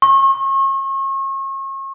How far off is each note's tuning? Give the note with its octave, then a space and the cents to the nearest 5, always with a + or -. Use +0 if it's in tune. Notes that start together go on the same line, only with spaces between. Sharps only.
C#6 -40